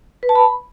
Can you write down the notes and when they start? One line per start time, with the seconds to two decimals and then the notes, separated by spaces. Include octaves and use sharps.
0.23 B4
0.29 A5
0.35 B5